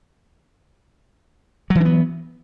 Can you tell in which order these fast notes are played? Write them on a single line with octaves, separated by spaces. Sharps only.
F#3 E3 D4 B3